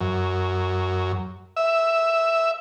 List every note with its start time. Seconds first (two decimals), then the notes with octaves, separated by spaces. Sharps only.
0.01 F#2
1.57 E5